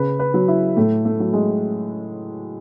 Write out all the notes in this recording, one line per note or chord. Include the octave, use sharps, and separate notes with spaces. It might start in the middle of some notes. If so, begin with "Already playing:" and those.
Already playing: C#3 B4
B4
F#3
E4
A2 A3
A3
F#3
G#3